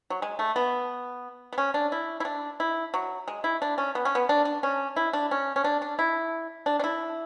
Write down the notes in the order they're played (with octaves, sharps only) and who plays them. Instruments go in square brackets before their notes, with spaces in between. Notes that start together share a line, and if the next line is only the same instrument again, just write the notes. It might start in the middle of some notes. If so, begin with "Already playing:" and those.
[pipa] F#3
G#3
A3
B3
B3
C#4
D4
E4
E4
D4
E4
F#3
G#3
E4
D4
C#4
B3
C#4
B3
D4
D4
C#4
E4
D4
C#4
C#4
D4
D4
E4
D4
D4
E4